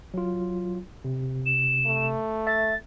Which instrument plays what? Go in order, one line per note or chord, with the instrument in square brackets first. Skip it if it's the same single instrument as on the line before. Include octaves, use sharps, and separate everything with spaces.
[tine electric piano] F#3 F4
C3
[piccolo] E7
[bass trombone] A3
[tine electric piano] E5 [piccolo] A6